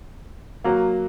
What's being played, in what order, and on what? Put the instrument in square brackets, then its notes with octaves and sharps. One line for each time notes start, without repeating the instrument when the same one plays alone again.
[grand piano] F#3 A#3